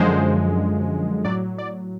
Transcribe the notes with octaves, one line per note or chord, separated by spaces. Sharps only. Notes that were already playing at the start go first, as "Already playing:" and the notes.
Already playing: F#2 D3 F3 G#3 C5
A2 F#3 D5
D5